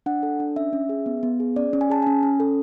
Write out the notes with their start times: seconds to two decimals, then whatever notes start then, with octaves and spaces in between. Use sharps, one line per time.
0.06 D4 F#5
0.23 A4
0.40 D4
0.56 C#4 E5
0.73 C#4
0.89 G#4
1.06 B3
1.23 B3
1.40 G#4
1.56 C#4 D5
1.73 C#4
1.81 G#5
1.90 G#4 A5
2.02 C#4 G#5
2.23 C#4
2.40 A4